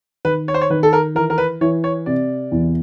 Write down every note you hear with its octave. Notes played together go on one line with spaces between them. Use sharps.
D#3 B4
C#5
C5
C#5
D#3 B4
A4
A#4
E3 A#4
A#4
B4
E3 C#5
C#5
C3 D5
E2